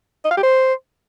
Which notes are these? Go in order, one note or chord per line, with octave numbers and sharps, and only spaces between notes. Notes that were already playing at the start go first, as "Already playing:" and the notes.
D#5
F5
G4
C5